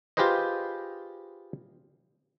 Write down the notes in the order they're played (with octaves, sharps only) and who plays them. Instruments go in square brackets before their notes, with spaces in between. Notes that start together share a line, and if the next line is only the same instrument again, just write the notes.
[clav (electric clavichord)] F4 G4 G#4 B4 C5 D#5